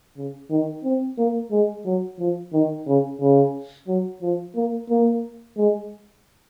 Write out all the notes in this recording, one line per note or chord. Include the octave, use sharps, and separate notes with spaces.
C#3
D#3
C4
A#3
G#3
F#3
F3
D#3
C#3
C#3
F#3
F3
A#3
A#3
G#3